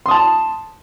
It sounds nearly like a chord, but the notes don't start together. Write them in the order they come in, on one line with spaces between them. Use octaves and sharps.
C6 D#6 A5